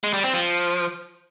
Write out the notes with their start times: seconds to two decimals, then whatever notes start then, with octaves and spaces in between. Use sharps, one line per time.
0.04 G#3
0.14 G3
0.24 C4
0.34 F3